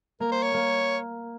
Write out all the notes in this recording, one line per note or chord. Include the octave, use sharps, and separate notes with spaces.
A#3 A#4
C5
C#5
A#3